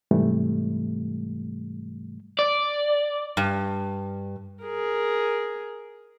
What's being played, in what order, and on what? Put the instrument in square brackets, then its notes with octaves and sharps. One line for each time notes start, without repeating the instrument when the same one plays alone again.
[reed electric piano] G#2 C3 E3 G3 A3
[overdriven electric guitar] D5
[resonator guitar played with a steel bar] G2
[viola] G#4 A#4